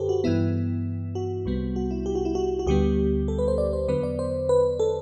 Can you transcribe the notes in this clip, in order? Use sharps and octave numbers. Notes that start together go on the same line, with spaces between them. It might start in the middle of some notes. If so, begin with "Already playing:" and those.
Already playing: F#2 D3 G4 A4 B4 C5
F#4
G2 E3 B3 E4
F#4
C2 C3 G3 B3
F#4
E4
G4
F#4
E4
F#4
F#4
D2 D3 G3 B3 G4
A4
B4
C5
D5
C5
E2 D3 F#3 B3 B4
D5
C5
B4
A4